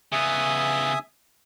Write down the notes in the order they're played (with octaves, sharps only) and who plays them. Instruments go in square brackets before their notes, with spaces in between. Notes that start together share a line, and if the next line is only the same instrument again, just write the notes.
[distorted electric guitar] C#3 B3 [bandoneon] E5 G#5 D#6